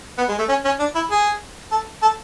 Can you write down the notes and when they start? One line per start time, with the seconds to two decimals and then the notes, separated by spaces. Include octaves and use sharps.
0.18 B3
0.29 G#3
0.38 A3
0.49 C#4
0.65 C#4
0.79 D4
0.95 E4
1.11 G#4
1.72 A4
2.02 A4